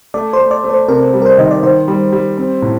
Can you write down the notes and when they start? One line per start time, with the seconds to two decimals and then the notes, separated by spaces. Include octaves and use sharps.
0.14 A3 D5
0.33 C5
0.39 A3
0.51 D5
0.64 A3
0.70 C5
0.88 C3 A#4
1.13 G3
1.22 A#4
1.26 C5
1.38 D#3 D#5
1.51 D5
1.63 D#3 C5
1.88 G3
2.13 G3
2.38 C4
2.62 A2